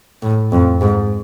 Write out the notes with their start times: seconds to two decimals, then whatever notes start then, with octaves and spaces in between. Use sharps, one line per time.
0.22 A2
0.52 F2
0.81 G#2